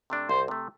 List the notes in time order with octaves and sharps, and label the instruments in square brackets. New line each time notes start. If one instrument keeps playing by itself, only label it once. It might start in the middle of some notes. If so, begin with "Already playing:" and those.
[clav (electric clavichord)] C3 A3 D4
[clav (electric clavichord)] C2 [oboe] C5
[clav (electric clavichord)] C3 A3